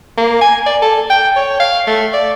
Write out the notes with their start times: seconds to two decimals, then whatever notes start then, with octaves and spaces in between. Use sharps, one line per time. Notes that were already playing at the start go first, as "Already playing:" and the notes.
0.17 A#3
0.41 G#5
0.66 D5
0.82 A4
1.10 G5
1.36 C#5
1.60 F5
1.87 A3
2.13 D5